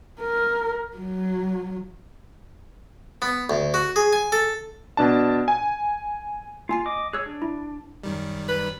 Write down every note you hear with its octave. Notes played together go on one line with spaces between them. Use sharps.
A#4
F#3
B3
D2
F#4
G#4
G#5
A4
B2 D4 A5
G#5
A#3 F4 G#5 C7
D#5 D6
G#4 C#5 E6 F#6
D4
E4
F#2 D#3 G3
B4